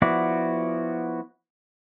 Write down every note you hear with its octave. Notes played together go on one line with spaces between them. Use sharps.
F3 B3 E4 F#4 D5